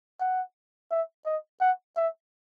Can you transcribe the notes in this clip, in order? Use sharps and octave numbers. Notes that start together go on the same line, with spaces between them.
F#5
E5
D#5
F#5
E5